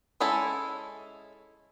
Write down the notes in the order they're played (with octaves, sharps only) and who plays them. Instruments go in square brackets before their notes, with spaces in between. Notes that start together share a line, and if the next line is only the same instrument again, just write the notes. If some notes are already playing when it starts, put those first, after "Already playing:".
[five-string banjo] G#3 C#4 E4 A4